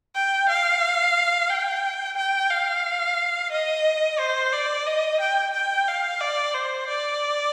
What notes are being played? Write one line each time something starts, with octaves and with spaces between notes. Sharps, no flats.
G5
F5
G5
G5
F5
D#5
C5
D5
D#5
G5
G5
F5
D5
C5
D5